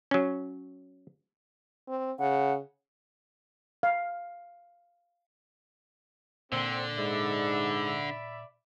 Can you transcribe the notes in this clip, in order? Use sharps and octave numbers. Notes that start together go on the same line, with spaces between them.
F#3 C#4
C4
C#3 F#5
F5
A#2 D3 C4
G#2 D5 E5 B5